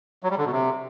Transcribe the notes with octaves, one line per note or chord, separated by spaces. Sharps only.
F#3
G3
D3
B2
C3